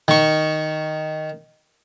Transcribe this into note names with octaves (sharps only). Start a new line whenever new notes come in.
D#3 C#6